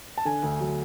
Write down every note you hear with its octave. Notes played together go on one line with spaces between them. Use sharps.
A5
D3 G#5
D2
F#3